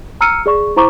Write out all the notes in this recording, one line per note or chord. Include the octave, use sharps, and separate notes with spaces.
A#5 E6 F6 C#7 D#7
G#4 D5 C#6
E4 C5 A#5 C#6 D6